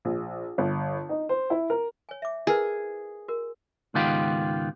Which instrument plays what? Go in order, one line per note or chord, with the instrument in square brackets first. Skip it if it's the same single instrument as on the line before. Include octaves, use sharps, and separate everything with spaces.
[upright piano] A#1
G1
D#4
C5
E4
A#4
[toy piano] C#5 G#5
E5 D6
[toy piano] E4 A#4 B4 [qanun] G#4
[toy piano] F#4 A#4
[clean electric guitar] C#2 G#2 D#3 B3 F4 G4